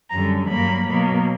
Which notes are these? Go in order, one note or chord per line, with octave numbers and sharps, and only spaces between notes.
F#2 D3 G3 A#5
G2 F#3 A#3 B5
B2 F#3 A#3